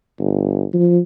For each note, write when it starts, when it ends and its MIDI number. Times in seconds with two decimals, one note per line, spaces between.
0.19 0.64 31
0.73 0.99 53